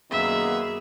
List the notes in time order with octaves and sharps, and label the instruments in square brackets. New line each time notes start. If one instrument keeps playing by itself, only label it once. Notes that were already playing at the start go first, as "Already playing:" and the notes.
[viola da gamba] F#2 G#4 [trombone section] D#3 A#3 B3 [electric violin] E5